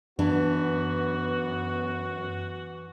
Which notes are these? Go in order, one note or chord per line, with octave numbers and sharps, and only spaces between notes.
F#2 E3 B3 D4 F#4